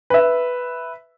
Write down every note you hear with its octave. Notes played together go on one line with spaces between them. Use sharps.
B4 E5